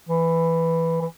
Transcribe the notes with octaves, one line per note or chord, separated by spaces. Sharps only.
E3
E3